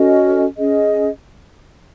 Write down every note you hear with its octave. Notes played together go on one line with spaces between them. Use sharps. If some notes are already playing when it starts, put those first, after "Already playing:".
Already playing: C#4 F#4 A4 D#5
C#4 G#4 D#5